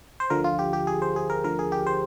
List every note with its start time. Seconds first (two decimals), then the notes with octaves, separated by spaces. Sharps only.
0.20 C5
0.30 D2 D3 F3 A#4
0.44 F4
0.59 G4
0.73 G4
0.87 G#4
1.02 C5
1.16 G#4
1.30 A#4
1.44 D2 D3 F3 A#4
1.59 G#4
1.72 G4
1.87 C5